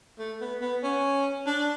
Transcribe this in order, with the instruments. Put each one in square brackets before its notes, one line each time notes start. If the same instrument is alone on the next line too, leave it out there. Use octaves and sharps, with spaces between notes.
[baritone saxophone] A3
B3
B3
C#4
D4